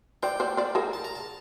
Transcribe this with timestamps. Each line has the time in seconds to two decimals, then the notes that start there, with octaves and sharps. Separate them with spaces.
0.23 C5 D5 G5
0.40 C5 D5
0.57 C5 D5
0.75 G#4 A#4
0.93 A5
1.04 A#5
1.15 A5